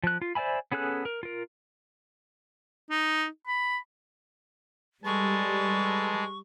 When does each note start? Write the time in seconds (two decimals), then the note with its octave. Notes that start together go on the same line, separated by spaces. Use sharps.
0.04 F3 F#6
0.22 F4
0.35 C5 D5 E5 G#5 B5
0.72 B3 C#4 G#4 A4 F#6
1.05 A#4
1.23 F4 A#4
2.90 D#4
3.47 B5
5.05 G3 G#3 A4 B4 A5 C#6